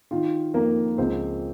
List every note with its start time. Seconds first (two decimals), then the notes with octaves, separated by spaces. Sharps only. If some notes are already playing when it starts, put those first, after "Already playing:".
0.11 D#3 F4
0.54 F2 A#3 A#4
0.98 C#2 C4 C5